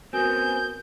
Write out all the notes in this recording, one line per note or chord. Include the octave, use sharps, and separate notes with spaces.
B3 C4 F#4 A#4 G#5 D#6 G6